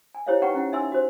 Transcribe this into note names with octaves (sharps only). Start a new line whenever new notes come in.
G#5
E4 G4 C5 C#5 D#5 F5
D#4 B4 F#5 G5 A#5 C#6
C#4 E4 F#5
D#4 E5 G#5 C6 E6
F#4 C5